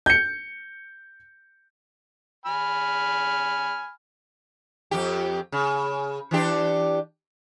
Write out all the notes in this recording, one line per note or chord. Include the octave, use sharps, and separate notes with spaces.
G6 C#7
G#5 B5 F6
F2 G4
C#3
E3 D4 G4